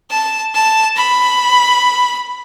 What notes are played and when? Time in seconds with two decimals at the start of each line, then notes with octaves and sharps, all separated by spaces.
0.11 A5
0.55 A5
0.97 B5